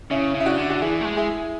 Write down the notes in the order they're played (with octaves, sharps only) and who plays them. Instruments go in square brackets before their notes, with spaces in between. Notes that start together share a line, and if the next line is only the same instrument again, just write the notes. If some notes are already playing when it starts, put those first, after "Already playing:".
[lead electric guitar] C#3 [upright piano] C#4 E4
[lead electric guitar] C#3
[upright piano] E4
D4 F#4
[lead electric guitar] D3
[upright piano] F#4
[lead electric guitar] E3 [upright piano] E4 G#4
[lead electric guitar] A3
G#3
[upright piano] E4 G#4